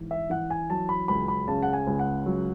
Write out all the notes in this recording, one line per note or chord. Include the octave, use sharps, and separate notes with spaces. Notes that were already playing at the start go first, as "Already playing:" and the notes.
Already playing: G#2 E3
E5
E3 F#5
G#5
F#3 A5
B5
C#2 B5
B5
C#3 A5
F#5
G#5
C#2
F#5
F#3